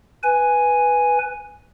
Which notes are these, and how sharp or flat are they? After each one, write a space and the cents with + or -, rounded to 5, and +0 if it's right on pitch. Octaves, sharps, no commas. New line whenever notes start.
B4 +0 G#5 +0